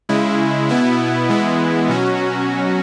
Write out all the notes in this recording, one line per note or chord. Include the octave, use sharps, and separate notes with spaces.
C#3 G#3 E4
B2 B3 E4
E3 G#3 B3 E4
B2 F#3 C#4 F#4